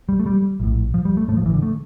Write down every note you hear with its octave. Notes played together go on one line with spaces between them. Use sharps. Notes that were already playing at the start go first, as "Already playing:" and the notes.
G3
A3
G3
A#1 A2
F3
G3
A3
A2 A3
A1 F3
E3
D3
A3